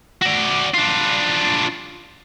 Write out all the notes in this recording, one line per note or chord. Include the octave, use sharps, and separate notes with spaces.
F#4 D5
D4 F4